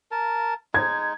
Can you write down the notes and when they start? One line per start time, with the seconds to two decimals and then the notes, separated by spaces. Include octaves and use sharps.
0.11 A#4 A5
0.74 G#3 D#4 G#6